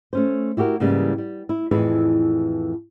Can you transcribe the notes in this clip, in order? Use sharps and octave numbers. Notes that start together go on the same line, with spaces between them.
A3 C#4 C5
E4 F#4 G4 A4 A#4
G#2 C#3 E3 G3 A#3
G3
E4
F2 A2 E3 E4 G#4 B4